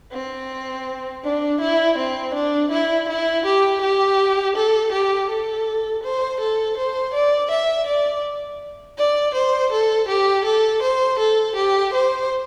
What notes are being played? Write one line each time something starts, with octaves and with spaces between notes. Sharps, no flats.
C4
D4
E4
C4
D4
E4
E4
G4
G4
A4
G4
A4
C5
A4
C5
D5
E5
D5
D5
C5
A4
G4
A4
C5
A4
G4
C5